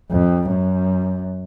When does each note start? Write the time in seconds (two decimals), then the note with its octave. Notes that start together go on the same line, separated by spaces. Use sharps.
0.11 F2
0.50 F#2